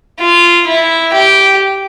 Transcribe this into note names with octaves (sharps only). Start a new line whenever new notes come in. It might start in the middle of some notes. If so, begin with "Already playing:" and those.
F4
E4
G4